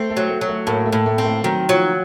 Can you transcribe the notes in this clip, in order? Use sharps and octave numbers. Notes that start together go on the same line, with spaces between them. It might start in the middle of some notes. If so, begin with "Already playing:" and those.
Already playing: A3 C4
A3
F#3
A3
F#3
A3
A2 A#3
A3
A2
A3
C4
A3
D#3 F#3
F3 F#3